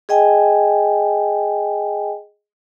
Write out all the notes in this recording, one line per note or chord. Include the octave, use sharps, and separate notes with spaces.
G#4 D#5 G5 G#5